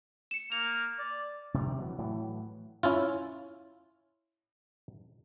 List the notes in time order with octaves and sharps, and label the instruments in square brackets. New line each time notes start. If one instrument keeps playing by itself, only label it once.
[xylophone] C#7 E7
[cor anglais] A#3 [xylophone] F7
[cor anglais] D5
[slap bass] C3 D#3 F3 G3
E3 F#3
A2 E3 F#3
[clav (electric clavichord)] C#4 E4 F4